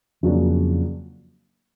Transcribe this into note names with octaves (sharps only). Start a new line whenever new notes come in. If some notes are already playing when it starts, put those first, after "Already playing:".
F2 C#3 F#3 A#3 D4